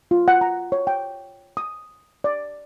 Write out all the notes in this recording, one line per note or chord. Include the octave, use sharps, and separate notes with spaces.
F4
F#5
A#5
C#5
G5
D#6
D5